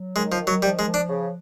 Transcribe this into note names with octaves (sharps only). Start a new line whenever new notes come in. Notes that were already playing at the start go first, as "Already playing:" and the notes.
Already playing: F#3
D#3 G#3
F3
D#3
F#3
F3 G3
G#3
F3
D4
C#3